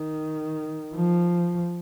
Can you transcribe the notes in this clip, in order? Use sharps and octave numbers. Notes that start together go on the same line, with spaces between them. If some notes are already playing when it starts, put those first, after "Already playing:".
Already playing: D#3
F3